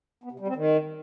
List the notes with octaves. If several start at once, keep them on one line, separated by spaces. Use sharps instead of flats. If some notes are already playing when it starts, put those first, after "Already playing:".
B3
C3
G3
C4
D#3